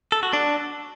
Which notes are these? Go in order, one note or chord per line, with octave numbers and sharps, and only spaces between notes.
A4
F#4
D4